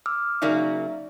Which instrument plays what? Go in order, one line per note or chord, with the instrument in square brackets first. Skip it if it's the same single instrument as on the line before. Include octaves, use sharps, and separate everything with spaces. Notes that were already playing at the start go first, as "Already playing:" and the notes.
[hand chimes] D6 E6 F6
[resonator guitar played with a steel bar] C#3 F#3 A#3 [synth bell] D#4 D5 [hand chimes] E5